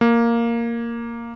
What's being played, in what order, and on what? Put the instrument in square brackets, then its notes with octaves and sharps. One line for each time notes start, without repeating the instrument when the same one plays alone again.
[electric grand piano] A#3